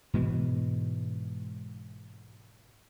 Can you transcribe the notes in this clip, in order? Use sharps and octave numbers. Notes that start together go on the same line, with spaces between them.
G#2 B2 E3 G#3